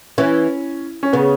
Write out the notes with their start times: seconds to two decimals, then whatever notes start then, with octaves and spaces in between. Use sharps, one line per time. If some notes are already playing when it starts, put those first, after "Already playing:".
0.18 E3 C#4
1.03 C#4
1.13 C#3 B3